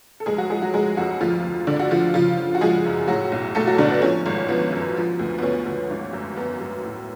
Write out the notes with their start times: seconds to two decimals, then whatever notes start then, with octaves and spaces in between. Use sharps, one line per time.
0.20 A4
0.26 F1 G#3 G#4
0.38 F#3 F#4
0.50 F3 G#3 G#4
0.62 F#3 F#4
0.74 F1 G#3 G#4
0.97 F2 F#3 F#4
1.21 D2 F3 F4
1.44 D2
1.67 D3 D4
1.79 F#4
1.91 D3 F3 F4
2.14 C#3 F3 F4
2.37 F3
2.55 F#4
2.61 F3 G#3 G#4
2.85 F#2
3.08 A2 F#3 F#4
3.32 B1
3.55 B1 A3 A4
3.67 F#3 F#4
3.78 B1 D3 D4
3.91 B3
4.02 F3 C#4
4.26 G#1
4.49 F3 B3
4.72 F#2
4.96 F3
5.19 D2
5.38 B3
5.42 D2 C#4
5.66 D2
5.90 G#1
6.13 F#2
6.37 F#2 B3
6.61 F#2
6.84 A2